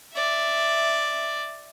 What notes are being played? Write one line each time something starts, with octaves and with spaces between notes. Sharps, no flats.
D5 E5